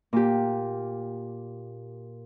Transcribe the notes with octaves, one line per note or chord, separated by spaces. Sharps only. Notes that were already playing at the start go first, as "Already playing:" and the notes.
A#2 G4